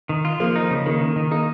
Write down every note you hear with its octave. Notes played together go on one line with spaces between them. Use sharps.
D#3
F4
F3 A#3
D#4
C#3
D#3 A#3
D#3
D#3
A#3 D#4